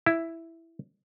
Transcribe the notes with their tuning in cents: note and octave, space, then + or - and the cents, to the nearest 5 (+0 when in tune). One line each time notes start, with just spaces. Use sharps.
E4 +5